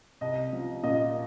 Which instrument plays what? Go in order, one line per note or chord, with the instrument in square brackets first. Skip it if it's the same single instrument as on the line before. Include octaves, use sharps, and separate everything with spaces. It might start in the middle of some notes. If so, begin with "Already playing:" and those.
[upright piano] C2 D#5
F3
A#2 D#5